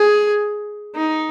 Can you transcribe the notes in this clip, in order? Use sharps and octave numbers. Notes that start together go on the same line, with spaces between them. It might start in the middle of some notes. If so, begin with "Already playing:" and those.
Already playing: G#4
D#4